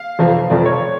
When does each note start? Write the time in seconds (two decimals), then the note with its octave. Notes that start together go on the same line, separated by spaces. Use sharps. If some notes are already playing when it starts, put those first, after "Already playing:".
Already playing: F5
0.19 F1 F2 F3
0.50 F1 F2 F3 D5
0.66 C#5